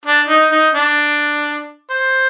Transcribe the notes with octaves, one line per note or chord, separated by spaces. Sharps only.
D4
D#4
D#4
D4
C5